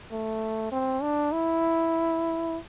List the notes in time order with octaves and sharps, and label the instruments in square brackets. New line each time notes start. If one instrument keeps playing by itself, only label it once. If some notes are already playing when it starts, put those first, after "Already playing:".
[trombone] A3
C4
D4
E4